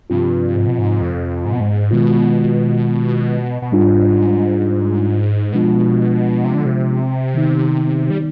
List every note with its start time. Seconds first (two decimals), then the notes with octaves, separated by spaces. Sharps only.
0.10 G2 C3 F3 C4 F4
0.55 G#2
0.67 B2
0.79 G#2
1.01 F2
1.45 G#2
1.53 B2
1.60 G#2
1.91 B2 D#3 G#3 B3 F4
3.62 B2
3.72 G#2 G3 D4 F4
5.53 B2 F3 G#3 B3 D4 F4
6.44 C3
6.55 D3
6.65 C3
7.34 D#3 B3 D#4
8.10 G3